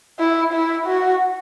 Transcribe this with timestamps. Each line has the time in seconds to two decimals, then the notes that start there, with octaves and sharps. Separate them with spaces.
0.19 E4
0.53 E4
0.87 F#4